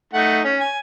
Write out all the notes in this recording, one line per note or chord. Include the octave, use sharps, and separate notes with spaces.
A3 D#4 F#5
C#4
G#5